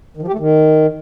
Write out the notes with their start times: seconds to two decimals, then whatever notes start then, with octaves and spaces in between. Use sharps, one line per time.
0.17 D#3
0.22 F3
0.28 G4
0.33 A3
0.39 D#3